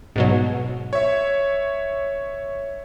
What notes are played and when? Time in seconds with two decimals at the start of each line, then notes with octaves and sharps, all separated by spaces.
0.16 G#2 B2 F#3
0.93 C#5 E5